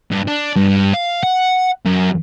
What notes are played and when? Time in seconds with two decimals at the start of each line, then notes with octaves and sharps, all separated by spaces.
0.11 G2
0.27 D4
0.56 G2
0.93 F5
1.23 F#5
1.86 F#2